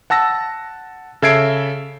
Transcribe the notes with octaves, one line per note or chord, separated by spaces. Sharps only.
F#5 A5 E6 A#6
C#3 A4 E5 G#6 C7 D7